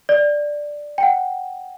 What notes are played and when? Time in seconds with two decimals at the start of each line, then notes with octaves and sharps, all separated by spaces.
0.09 D5
0.98 G5
1.03 F#5